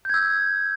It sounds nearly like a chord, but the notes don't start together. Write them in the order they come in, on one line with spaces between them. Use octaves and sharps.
G6 G#6 E6